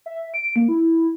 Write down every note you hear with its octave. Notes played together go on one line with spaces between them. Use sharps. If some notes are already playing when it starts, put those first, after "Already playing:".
E5
D7
A#3
E4